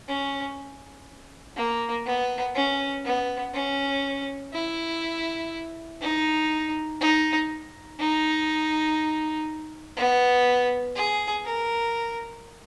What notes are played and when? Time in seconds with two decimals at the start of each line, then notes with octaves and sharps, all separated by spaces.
0.08 C#4
1.56 A#3
2.06 B3
2.55 C#4
3.05 B3
3.54 C#4
4.53 E4
6.01 D#4
7.01 D#4
8.00 D#4
9.97 B3
10.96 G#4
11.45 A#4